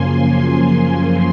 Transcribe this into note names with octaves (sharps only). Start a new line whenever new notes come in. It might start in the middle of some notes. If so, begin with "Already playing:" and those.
Already playing: F#2 C#3 F3 A#3 G#5 C6
C6